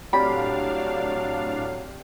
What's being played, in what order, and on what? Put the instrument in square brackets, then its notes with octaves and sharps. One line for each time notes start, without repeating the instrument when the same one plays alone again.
[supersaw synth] A2 D4 F5 [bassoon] F#3 [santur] C4 G4 D5 [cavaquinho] B5